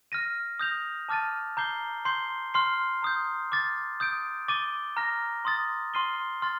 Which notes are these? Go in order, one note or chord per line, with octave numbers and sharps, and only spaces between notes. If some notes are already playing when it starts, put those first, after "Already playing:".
F6 A#6 D#7
D#6 G6 A#6 F7
A5 D6 F6 A6 D#7
A#5 D6 G6 C7 G7
C6 G6 C7 G7
C6 F6 C7 G7
A#5 D#6 G6
D6 F6 A6
D#6 G6 D7
D6 A6 D#7 G7
A#5 F6 A#6
C6 D#6 A6
C6 F6 C7 D#7 G7
C6 F6 A6